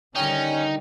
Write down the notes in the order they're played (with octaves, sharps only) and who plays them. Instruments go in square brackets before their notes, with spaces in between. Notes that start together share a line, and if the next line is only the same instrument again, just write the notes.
[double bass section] D3 D#3 G3 [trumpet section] C#4 [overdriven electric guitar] D#4 [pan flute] G5